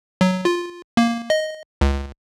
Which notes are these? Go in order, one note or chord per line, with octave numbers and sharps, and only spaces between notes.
F#3
F4
A#3
D#5
C#2